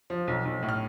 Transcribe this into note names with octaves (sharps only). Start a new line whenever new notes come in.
F3
B1
B1
A2
F6